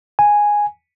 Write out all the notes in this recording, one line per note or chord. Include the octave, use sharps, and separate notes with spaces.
G#5